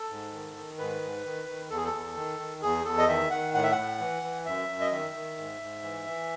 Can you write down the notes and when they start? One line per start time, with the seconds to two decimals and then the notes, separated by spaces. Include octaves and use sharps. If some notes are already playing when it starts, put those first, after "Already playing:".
Already playing: A4
0.10 G#2
0.33 D#3
0.56 D#3
0.78 G#2 B4
1.02 G#2
1.24 D#3
1.48 D#3
1.70 E2 A4
1.77 G#4
1.84 A4
1.93 E2
2.16 D#3
2.39 D#3
2.62 E2 G#4
2.85 E2 A4
2.98 D#5
3.08 D#3 E5
3.31 D#3 F#5
3.54 A2 F#5
3.63 E5
3.71 F#5
3.77 A2
4.00 E3
4.23 E3
4.45 F#2 E5
4.69 F#2
4.80 D#5
4.91 D#3 E5
5.15 D#3
5.38 G#2
5.61 G#2
5.84 E3
6.06 E3